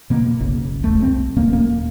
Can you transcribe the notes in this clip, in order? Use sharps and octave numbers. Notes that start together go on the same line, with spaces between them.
B2 A#3
F#1 B1 C#3
E1 E2 A3
C2 G3 C4
D#1 B2 A#3 C#4
D#1 A#3